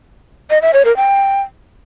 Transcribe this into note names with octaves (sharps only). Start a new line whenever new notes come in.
D#5
E5
C#5
A#4
G5